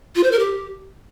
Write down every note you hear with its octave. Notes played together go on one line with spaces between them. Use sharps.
F4
C5
A#4
G4